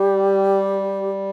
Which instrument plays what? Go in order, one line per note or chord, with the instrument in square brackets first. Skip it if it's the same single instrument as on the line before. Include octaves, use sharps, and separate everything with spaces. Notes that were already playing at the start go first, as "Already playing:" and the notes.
Already playing: [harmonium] G3 [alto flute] G4